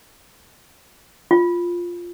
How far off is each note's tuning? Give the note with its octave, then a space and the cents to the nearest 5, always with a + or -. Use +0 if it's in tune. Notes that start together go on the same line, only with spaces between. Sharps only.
F4 +0